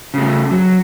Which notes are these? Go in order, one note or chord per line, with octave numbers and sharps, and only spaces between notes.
C#3 A3
F#3